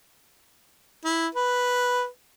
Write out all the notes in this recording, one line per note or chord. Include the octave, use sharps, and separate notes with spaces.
E4
B4